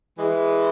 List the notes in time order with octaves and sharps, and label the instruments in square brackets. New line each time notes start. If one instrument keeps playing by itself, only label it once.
[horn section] E3 G#3